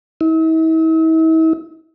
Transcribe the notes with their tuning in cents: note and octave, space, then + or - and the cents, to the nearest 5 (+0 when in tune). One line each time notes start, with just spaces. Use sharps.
E4 -45